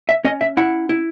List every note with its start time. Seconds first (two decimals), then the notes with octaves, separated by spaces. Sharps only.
0.09 E5
0.25 C#4 D#5
0.41 E5
0.57 E4 F#5
0.89 E4